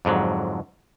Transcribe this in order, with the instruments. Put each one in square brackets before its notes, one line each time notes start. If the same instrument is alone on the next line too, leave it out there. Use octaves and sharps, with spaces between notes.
[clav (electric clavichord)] F2 G#2 D3 F#3